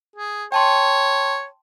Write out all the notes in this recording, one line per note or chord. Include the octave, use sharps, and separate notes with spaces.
G#4
C#5 G5 A5 C6